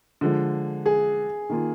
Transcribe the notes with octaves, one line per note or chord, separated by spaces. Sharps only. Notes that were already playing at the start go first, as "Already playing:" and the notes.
D3 F3 G#3
G#4
D#3 A#3 F4